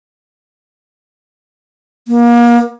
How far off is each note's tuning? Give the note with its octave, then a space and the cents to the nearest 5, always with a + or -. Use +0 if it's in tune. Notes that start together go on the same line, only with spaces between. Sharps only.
A#3 +30